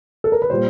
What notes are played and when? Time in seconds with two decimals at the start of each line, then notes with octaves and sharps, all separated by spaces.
0.24 A4
0.32 A#4
0.42 B4
0.50 A#2 G3 C5